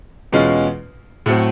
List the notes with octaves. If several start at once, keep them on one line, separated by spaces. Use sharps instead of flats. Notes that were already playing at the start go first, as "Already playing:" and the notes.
E2 B2 G#3 C#4 F4
A2 F#3 A3 C4